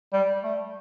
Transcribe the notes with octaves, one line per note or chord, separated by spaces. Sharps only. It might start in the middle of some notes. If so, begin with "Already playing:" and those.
G3
A3